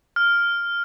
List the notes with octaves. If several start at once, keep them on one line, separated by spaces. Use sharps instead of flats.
F6